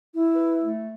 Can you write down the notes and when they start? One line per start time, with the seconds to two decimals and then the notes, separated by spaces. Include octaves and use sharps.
0.14 E4
0.35 B4
0.61 A3